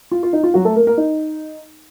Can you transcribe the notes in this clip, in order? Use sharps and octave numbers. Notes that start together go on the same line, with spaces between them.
F4
F4
D#4
F4
F#3 F#4
A3 A4
A#3 A#4
A#3 A#4
D#4